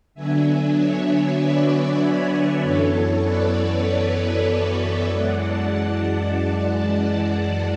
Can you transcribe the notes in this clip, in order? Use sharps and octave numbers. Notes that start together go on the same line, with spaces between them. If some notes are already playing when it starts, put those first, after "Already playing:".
D3 F#3 B3 D4 E5 G#5
C#5 E5
B4 D5
F#2 E3 B3 A4 C#5
B4 D5
B4 D5
C#5 E5
F#2 E3 G#3 D5 F#5
F#5 A5